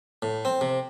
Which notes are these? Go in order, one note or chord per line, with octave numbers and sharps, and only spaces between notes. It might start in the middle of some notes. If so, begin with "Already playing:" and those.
A2
C4
C3